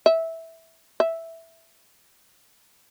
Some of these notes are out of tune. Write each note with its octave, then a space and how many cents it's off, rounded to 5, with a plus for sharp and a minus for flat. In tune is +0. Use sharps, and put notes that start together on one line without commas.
E5 -10
E5 +0